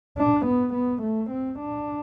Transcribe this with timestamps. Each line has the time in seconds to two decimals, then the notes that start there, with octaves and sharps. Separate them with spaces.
0.18 D4
0.46 B3
0.74 B3
1.02 A3
1.31 C4
1.59 D4